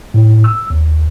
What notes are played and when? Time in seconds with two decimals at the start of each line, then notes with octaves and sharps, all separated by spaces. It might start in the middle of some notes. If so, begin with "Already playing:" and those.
0.14 A2
0.44 E6
0.70 D#2